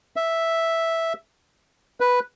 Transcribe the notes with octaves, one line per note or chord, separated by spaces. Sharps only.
E5
B4